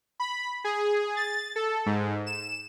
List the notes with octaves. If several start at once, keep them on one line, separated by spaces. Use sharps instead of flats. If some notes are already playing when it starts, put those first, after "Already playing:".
B5
G#4
A6
A4
G#2
E7